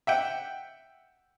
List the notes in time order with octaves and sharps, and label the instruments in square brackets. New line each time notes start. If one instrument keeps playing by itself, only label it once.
[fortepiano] E5 F#5 G5